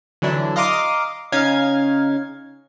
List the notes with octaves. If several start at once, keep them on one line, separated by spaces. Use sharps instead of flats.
D3 E3 F#3 D4 E4
D#5 F5 A#5 C6 D6 D#6
C#3 C#4 D#4 F5 G#6